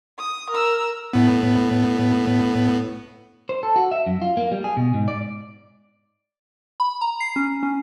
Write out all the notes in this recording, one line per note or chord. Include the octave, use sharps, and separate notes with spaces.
D#6
A#4 E6
A2 B3
C5
A4
F#4
E5
F#2
F4
A#3
G3
G#4
B2
G#2
D5
B5
A#5
C7
C#4
C#4